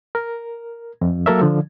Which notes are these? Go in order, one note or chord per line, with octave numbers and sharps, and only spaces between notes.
A#4
F2
F#3 A#3 A4 A#4 C#5 E5
D3 F3